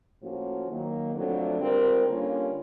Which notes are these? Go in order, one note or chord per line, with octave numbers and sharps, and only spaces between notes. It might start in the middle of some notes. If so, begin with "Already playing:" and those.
A2 F3 A#3 C#4 F#4
D#3 F#3 A#3
F2 D3 F#3 A3 D4
G3 C4 F4 A#4
D3 G3 A#3 C#4 F4